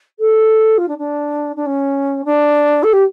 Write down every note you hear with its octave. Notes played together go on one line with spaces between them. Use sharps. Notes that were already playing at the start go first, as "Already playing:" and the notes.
A4
F4
D4
D4
D4
C#4
D4
A4
G4